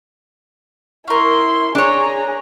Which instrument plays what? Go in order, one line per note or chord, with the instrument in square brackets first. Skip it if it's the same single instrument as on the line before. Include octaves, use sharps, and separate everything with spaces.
[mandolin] C#4 A#4 [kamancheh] E4 C6
[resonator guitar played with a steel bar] D4 C#5 [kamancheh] G#4 A#5